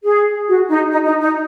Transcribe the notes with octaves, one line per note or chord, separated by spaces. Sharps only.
G#4
F#4
D#4
D#4
D#4
D#4